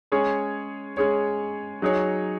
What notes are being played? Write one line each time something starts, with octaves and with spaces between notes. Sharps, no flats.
G#3 C#4 G#4 C#5
G#3 C#4 G#4 C#5
F#3 D#4 G#4 C#5